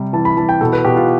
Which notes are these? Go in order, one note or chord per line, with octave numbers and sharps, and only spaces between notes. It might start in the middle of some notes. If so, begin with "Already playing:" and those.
Already playing: C3 G3
E3 A5
B5
E3 A5
G5
B2 A4
B4
B2 G4
F4